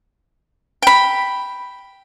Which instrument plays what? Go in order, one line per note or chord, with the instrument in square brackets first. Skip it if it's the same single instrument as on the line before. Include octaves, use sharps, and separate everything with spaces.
[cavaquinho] G5 B5